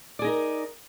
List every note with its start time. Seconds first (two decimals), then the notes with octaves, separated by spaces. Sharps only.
0.19 D5
0.22 G#4
0.24 D#4
0.27 A#4